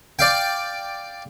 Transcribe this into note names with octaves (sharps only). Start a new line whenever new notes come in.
D5 F5 G5